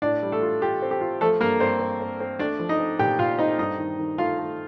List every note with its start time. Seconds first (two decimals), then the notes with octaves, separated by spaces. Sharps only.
0.02 A2 D4 D5
0.23 G3
0.32 A3 A4
0.42 F4
0.61 F4 G4
0.82 C4
0.91 G4
1.01 F4
1.21 F3 A3 A4
1.41 G2 A#3 A#4
1.60 G2 C4 C5
1.80 C4
2.01 C4
2.20 C4
2.39 A3 D4 D5
2.59 F3
2.69 D#4 D#5
2.79 C4
2.99 A#2 G4 G5
3.19 A#2 F4 F5
3.38 C4 D#4 D#5
3.59 G2 D#4 D#5
3.78 D#3
3.99 D#3
4.18 A3 F4 F5
4.38 A3